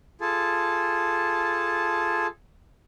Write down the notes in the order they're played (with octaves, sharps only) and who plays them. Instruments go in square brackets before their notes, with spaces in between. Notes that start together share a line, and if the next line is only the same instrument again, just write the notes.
[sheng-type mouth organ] F4 G#4 A4 A5